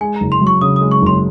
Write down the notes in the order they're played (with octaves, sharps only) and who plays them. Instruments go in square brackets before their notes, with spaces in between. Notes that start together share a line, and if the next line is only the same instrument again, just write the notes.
[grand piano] G#3 [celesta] G#5
[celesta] A#5
[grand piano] F#1
[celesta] C6
[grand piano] F#2
[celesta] C#6
[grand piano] C#3 [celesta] D#6
[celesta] D#6
[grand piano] G#3
[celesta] C#6
[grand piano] F#1 [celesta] C6